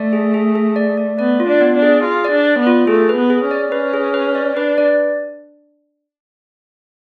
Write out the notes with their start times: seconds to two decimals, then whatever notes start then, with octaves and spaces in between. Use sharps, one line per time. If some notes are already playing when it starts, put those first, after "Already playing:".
Already playing: A3 D5
0.13 G#4
0.34 G#4
0.55 G#4
0.76 D5
0.98 D5
1.19 B3 D5
1.40 F4
1.47 D4
1.61 B3
1.75 D4
1.82 G#4
2.03 F4 G#4
2.25 D5
2.31 D4
2.45 D5
2.59 B3
2.67 F4
2.87 A3 G#4
3.09 B4
3.16 B3
3.30 G#4
3.44 C#4
3.51 D5
3.72 C#4 B4
3.93 G#4
4.14 B4
4.35 D5
4.57 D4 B4
4.78 D5